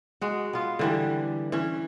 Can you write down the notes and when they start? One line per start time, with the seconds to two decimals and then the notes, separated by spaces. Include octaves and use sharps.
0.21 G#3 F#4
0.53 B3 F4
0.79 D3 E3 G3
1.52 E3 C#4